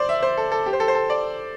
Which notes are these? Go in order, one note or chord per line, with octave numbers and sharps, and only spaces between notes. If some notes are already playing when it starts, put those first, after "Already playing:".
Already playing: C5 D5
E5
C5
A4
A4
G4
C5
A4
C5
A4
D5